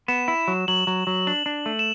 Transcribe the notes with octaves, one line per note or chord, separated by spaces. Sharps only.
B3 E7
E4
F#3
F#3 F#7
F#3
F#3
D4 F#7
D4
A3
E7